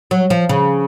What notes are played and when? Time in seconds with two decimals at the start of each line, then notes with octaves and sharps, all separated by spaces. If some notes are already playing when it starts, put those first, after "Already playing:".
0.11 F#3
0.30 F3
0.49 C#3